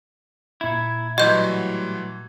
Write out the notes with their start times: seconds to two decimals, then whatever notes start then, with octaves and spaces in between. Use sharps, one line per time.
0.61 A#2 E4 G#6
1.18 A2 E3 F#3 G3 F#4 D#5 C6 G6